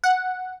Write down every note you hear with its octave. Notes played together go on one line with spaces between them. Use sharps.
F#5